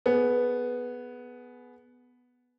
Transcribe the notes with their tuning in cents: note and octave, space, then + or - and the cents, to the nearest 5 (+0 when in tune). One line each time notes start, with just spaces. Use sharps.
B3 +0 G#4 +25